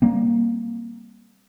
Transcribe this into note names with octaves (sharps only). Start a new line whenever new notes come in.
G3 A#3 C4